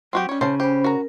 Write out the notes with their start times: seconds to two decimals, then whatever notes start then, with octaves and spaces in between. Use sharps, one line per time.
0.13 F#3 C4 F#4 G4
0.29 G3 C#4 C#5
0.41 C#3 C5 F5 A5
0.60 G4 C5 B5
0.84 F#4 A#4 A#5